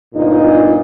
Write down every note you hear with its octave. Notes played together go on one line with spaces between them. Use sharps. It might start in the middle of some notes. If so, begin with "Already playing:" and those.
G1 A#2 D#4